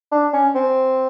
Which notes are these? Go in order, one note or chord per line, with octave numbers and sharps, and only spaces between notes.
D4
C#4
C4